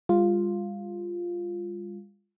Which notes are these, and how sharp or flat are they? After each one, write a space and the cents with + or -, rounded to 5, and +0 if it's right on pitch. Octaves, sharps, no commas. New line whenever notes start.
G3 +45 F4 +0